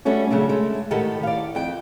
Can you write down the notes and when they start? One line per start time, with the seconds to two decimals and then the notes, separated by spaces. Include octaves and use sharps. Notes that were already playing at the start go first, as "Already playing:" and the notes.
0.05 G3 A3 C#4 F#4
0.30 C#3 F#3 A3 D4
0.49 G#3 A3
0.91 A2 D#3 G4 A4 F#5
1.23 D5 F5
1.55 F2 G5